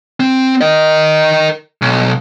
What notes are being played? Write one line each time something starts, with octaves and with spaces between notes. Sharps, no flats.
C4
A#4 D#5
B1